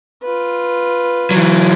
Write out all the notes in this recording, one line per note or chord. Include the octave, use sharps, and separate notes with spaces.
F4 B4
E3 F#3